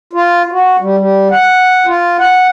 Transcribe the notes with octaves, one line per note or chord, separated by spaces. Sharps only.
F4
F#4
G3
G3
F#5
F4
F#5